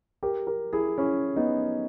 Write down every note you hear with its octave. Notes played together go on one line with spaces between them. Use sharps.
G4 A#4
G4 A#4
E4 G#4
C#4 E4
B3 D#4